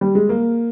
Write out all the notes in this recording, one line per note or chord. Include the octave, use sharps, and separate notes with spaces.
G3
G#3
A#3